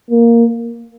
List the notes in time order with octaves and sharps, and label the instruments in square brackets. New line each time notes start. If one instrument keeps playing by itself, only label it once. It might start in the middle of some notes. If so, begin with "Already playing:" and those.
[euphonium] A#3